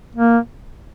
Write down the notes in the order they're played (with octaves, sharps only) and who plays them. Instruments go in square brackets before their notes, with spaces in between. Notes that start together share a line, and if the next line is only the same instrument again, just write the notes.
[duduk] A#3